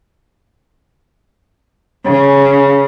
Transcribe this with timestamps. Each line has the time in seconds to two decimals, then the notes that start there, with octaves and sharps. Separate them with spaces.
2.07 C#3